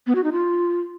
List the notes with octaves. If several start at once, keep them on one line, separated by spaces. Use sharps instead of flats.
B3
F#4
D#4
F4